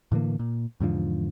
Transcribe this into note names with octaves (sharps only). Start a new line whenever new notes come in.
A2 D3 E3 A#3
A#2
E2 G#2 D3 F3